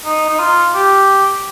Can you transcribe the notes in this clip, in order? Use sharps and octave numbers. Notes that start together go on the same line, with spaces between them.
D#4
D#4
F4
G4